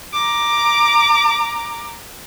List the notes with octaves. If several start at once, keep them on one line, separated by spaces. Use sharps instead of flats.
A#5 D6